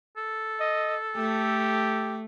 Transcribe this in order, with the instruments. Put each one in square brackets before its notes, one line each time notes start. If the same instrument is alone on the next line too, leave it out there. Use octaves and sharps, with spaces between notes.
[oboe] A4
[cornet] D#5
[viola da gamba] A3 [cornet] G4